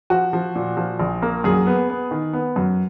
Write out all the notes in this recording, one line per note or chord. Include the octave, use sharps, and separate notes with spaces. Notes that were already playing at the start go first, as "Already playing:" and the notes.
F3 F#4
F3
A#2
F3
A#1
A#3
F#2 G#4
B3
B3
D#3
B3
F#2